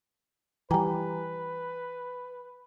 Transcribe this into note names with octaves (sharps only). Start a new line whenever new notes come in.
E3 G3 B4 G5 G#5 A#5